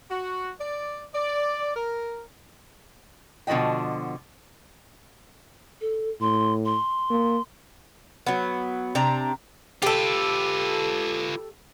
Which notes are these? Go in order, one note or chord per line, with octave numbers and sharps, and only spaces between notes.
F#4
D5
D5
A#4
B2 D3 F3 F#4 D#5 G5
A4
A2 C6
C6
A#3
F#3 B3
C3 D4 A#5
F4 G4 A4 B4